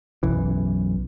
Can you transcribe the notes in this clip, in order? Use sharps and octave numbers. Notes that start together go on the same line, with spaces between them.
B1 F#2 E3